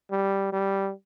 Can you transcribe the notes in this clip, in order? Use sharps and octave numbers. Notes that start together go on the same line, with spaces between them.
G3
G3